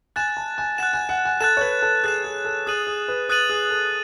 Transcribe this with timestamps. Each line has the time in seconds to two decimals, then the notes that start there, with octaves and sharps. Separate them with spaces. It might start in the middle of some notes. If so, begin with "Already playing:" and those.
0.16 G#5 F#6 A6 E7
0.37 A5
0.58 G#5
0.78 F#5 F#6 A6 E7
0.93 G#5
1.09 F#5
1.25 G#5
1.41 A4 F#6 A6 E7
1.57 C#5
1.61 B4
1.82 A4
2.03 G#4 F#6 A6 E7
2.24 G#4
2.45 A4
2.66 G#4 D#6 F#6 A6 D#7 F#7
2.87 G#4
3.08 B4
3.29 B4 D#6 F#6 A6 D#7 F#7
3.49 G#4
3.70 A4